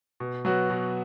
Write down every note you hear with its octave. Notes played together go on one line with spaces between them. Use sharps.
B2
F#3 B3 F#4
B2